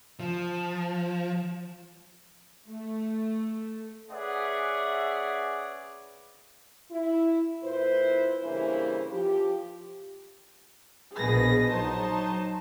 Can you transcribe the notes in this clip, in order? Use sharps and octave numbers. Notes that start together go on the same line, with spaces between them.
F3
A3
C#4 G#4 B4 D5 E5 F#5
E4
A#2 E4 B4 C5
G2 C#3 E3 A#3 E4 C5
F3 G4
A#1 B2 G#4 B4 A#6
F#3 D#4 C5 A5